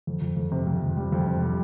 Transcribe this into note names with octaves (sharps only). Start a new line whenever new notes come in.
F2
F2
F2
C3
F2
F2
G3
F2
C3
G3